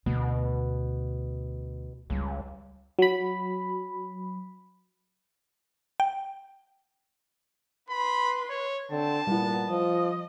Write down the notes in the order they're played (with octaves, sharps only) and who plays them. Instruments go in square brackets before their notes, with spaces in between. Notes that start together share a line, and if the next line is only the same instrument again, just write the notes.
[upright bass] D2 [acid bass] B2
[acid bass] C#2 [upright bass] G3
[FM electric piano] F#3 B5
[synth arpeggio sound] G5
[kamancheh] B4 C6 [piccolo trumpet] B5
[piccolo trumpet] C#5
[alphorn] D3 [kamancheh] C4 [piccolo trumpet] A5
[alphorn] A#2 [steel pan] G3 E4 [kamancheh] B3
[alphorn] F3 [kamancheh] D#5